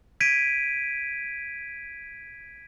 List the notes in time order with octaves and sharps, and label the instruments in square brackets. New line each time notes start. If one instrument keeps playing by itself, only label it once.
[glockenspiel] G#6 B6 D7 D#7